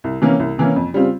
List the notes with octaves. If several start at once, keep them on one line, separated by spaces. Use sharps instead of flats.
C2
C3 E3 A#3 C#4
C2
C3 E3 A#3 C#4
F2
C#3 G3 C4 F4